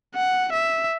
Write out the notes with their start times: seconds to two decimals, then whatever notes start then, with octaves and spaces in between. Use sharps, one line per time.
0.14 F#5
0.53 E5